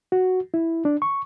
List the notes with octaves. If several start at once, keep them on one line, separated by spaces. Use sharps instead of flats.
F#4
E4
D4
C#6